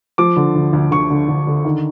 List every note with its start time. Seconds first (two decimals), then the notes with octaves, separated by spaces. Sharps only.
0.18 F3 D6
0.37 D3
0.55 D2
0.73 D2
0.91 D2 C#6
1.10 D3
1.28 D2
1.47 D3
1.65 D#3